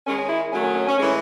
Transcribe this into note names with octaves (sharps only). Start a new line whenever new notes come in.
D#3 G#3 C#4
C#4
E4
D#3 F#3 A3 C#4
C#4
C#4
C#4
A2 E3 G#3 C#4